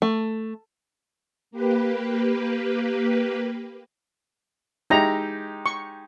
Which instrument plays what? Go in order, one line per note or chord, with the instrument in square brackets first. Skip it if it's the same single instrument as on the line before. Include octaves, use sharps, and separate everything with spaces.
[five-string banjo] A3
[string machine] A#3 G4 B4
[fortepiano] G#3 D#4 G4 [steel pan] E4 A#5
[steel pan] C#6